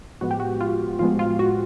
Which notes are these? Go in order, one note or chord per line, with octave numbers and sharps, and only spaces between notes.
A2 F3 G#3 B3 F#4
G4
F#4
F4
A2 F3 G#3 B3 F4
F4
F#4